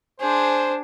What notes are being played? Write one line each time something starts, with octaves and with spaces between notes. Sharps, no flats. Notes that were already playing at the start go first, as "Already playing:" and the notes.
D4 G#4 C5